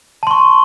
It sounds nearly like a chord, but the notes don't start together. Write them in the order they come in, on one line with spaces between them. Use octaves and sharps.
A5 C6 C#6